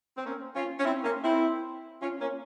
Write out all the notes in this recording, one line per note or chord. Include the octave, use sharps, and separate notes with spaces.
C4
A#3 C#4
C#4 F4
C#4
C4 E4
A#3 C#4
C4 E4
C#4 F4
A#3 C#4